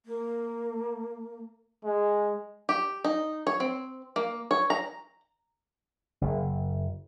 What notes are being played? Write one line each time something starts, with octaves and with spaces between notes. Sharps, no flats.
A#3
G#3
G4
D#4
C#5
C4
A#3
C#5
A#5
F#1